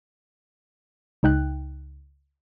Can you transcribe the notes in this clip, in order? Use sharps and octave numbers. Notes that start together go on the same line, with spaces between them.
C#2 D#4 G5 F#6